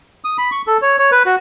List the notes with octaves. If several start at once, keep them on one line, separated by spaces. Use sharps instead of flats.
D#6
B5
C#6
A4
C#5
C#5
B4
F#4